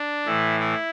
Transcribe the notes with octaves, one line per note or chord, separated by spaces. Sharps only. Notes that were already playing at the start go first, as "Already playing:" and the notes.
Already playing: D4
A2 E3 E4
E4